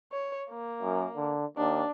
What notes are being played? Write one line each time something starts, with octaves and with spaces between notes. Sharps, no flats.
C#5
A#3
F#2
D3
D#2 D4